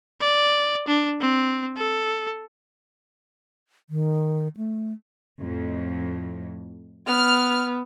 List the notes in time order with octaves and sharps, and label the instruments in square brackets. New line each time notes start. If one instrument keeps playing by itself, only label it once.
[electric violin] D5
D4
C4
A4
[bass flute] D#3
A3
[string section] F2 A2
[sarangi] B3 [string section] F6